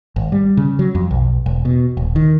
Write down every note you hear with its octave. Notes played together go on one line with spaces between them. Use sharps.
G#1
G3
C#3
F#3
F2
B1
E1
B2
D#1
D#3